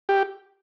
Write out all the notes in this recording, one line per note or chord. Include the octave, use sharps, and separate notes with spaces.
G4